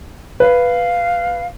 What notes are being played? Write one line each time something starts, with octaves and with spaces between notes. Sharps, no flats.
B4 F5